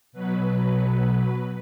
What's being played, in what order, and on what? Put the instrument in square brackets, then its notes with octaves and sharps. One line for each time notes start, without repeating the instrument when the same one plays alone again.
[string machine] B2 F#3 B4